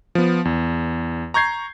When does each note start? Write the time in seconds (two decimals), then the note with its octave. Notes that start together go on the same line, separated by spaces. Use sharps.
0.15 F3 B3
0.45 E2
1.34 A#5 C#6 G6 G#6 C7